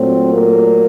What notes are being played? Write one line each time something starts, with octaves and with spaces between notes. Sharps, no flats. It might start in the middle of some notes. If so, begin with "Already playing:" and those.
Already playing: A#2 F#3 A3 C4
A#3